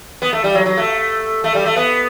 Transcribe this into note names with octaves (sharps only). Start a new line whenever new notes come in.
B3
A3
G3
F#3
F#3
A3
A3
G3
A3
B3